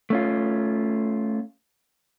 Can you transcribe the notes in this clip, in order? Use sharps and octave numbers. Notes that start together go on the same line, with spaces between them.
A3 C#4 F4